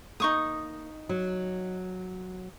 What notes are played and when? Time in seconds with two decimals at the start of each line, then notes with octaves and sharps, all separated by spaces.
0.20 A#3 D#4 C#6 D#6
1.09 F#3